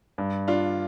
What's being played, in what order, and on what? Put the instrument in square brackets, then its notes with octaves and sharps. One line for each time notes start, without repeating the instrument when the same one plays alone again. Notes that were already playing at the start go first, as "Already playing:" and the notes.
[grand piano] G2
[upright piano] D4 F4